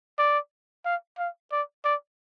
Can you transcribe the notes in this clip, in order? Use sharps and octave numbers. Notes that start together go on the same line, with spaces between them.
D5
F5
F5
D5
D5